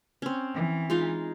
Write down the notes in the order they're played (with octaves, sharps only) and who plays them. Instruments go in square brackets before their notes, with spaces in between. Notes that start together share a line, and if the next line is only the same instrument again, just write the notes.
[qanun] C4 C#4
[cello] E3
[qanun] G#3 D#4 F4